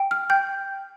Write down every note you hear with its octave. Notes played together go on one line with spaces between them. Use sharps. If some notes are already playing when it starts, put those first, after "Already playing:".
Already playing: G5
F6
G5 G6